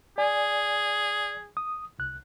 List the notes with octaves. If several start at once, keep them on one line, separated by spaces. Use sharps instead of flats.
G#4 D5 G#5
D#6
C2 F#6